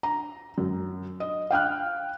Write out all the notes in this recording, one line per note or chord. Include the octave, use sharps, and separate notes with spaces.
A#5
F#2
D#5
F5 G5 F6 F#6